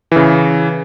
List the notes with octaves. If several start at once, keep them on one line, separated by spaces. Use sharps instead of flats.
C#3 E3